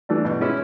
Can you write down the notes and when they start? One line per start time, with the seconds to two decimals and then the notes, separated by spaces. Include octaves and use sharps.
0.09 E3 A3 D4
0.25 B2
0.41 G#3 C#4 E4